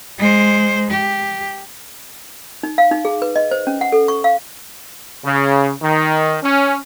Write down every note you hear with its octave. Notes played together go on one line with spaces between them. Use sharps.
G#3 C5
G4
D#4
F5
D#4
G#4
B4
D#5
C5
C#4
F#5
A4
C#6
F5
C#3
D#3
C#4